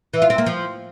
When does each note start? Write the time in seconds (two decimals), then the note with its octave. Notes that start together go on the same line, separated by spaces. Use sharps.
0.13 E3
0.22 F4
0.30 C4
0.38 A#3
0.46 F3